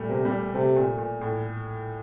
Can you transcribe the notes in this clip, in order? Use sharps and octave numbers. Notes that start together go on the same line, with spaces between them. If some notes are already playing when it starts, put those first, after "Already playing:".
Already playing: A#2 G3 A3
C3 A#3
G3
A3
C3 A3
A#2
A#2
A2